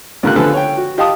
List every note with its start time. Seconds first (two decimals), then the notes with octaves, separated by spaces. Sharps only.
0.23 C#2 D3 A3 A#3 G4 F#6
0.36 D3 F3 A4 B4 G#5 B5
0.54 C#5 G5
0.78 F#4
0.97 F4 G4 D#5 F5 A5 D#6